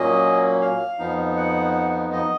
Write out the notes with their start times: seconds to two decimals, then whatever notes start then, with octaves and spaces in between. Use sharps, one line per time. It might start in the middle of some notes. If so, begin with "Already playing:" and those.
Already playing: A#2 F#3 A#3 C#4 D#5
0.61 F5
0.99 F2 F3 B3 D#4
1.37 F#5
2.13 D#5